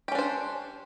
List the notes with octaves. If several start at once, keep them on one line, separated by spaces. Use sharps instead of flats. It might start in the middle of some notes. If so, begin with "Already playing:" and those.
C#4 D4 G4 C5